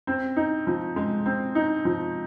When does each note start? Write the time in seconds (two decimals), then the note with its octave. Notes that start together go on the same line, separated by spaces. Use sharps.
0.07 C4
0.37 D#4
0.67 F3
0.96 G#3
1.26 C4
1.55 D#4
1.85 F3